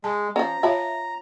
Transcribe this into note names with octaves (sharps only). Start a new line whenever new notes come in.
G#3 A5
F3 C#4 A#5
F4 C#5 E5 F5 A5 B5